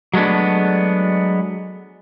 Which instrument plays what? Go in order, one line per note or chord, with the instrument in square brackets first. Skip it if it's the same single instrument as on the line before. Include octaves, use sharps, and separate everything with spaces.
[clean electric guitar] F#3 G#3 A3 B3 D4